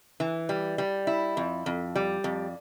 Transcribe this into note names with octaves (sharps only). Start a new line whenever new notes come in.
E3
G3
G3
E4
F2
F2
G3
F2